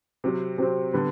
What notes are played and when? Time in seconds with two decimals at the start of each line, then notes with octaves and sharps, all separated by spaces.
0.24 C3 F#3 C4
0.58 C3 F#3 C4
0.93 D3 G3 B3